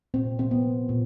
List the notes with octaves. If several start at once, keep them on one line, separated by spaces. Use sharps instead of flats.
A#2 C4
F3 C4
B3
A#3
A#2